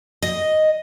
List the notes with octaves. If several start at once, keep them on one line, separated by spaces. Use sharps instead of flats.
D#5